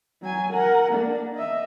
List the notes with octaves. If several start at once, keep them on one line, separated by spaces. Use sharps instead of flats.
F#3 G#5
A#4 F#5
A#3 D4
D#5 E5